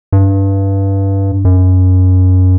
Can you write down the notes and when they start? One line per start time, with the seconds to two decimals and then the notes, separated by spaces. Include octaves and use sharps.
0.12 G2
1.45 F#2